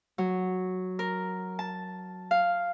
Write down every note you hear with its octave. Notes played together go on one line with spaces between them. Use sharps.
F#3
A#4
A5
F5